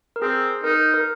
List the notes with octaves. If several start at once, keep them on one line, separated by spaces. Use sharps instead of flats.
A#4
C4 G#4
D#4 A#4
A#4